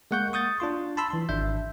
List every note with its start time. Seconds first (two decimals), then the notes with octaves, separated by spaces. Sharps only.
0.11 G#3 A#3 F#5 C#6 G6
0.33 C#6 D#6 G6 A6
0.60 D4 F4 C6
0.97 A5 B5 C6 E6
1.10 E3 C6
1.29 G#1 D4 E5 G6